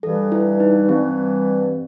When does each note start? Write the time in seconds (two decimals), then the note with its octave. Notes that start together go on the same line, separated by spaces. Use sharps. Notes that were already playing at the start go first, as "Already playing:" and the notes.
0.03 G2 E3 G3 A4
0.32 E4
0.60 D#4
0.89 G2 E3 G3 C4